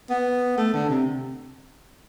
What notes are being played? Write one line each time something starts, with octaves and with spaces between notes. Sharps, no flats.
B3
A3
D3
C3